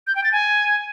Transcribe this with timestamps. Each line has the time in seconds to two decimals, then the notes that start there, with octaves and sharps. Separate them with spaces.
0.07 G6
0.15 G5
0.24 A6
0.32 G#5